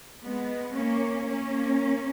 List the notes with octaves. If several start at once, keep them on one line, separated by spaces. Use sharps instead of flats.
G#3 B3
A#3 C#4
A#3 C#4